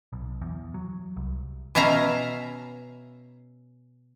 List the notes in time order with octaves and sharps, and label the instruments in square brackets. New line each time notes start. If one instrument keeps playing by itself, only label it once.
[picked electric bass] B1
E2
F#3
C2
[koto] B2 C#4 E5 F5 A#5